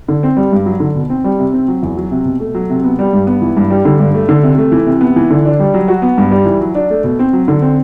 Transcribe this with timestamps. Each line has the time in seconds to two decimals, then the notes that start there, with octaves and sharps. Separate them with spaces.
0.08 D3
0.23 C4
0.37 G3
0.52 G2
0.66 F#3
0.80 D3
0.95 B2
1.10 C4
1.24 G3
1.39 C3
1.53 C4
1.68 F#3
1.83 E2
1.97 F#3
2.11 C3
2.25 B2
2.40 A3
2.55 F#3
2.70 C3
2.84 B3
2.99 G3
3.13 G2
3.27 B3
3.42 E3
3.57 G2
3.70 G3
3.85 D3
3.99 G2
4.14 A3
4.29 D3
4.43 C3
4.58 A3
4.72 E3
4.86 C3
5.01 B3
5.16 E3
5.30 D3
5.45 D4
5.59 G3
5.74 F#3
5.88 F#4
6.02 B3
6.18 G2
6.31 G3
6.46 E3
6.61 F#3
6.75 D4
6.90 A3
7.04 B2
7.19 C4
7.33 F#3
7.48 D3
7.62 C4